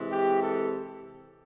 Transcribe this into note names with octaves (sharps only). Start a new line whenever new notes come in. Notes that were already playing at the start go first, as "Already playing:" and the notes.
Already playing: C3 E3 G#3
G4
A4